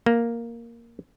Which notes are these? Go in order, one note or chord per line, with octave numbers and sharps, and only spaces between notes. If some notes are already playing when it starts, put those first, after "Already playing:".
A#3